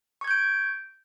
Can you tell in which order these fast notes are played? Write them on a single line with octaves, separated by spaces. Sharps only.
C#6 G#6 G6 D7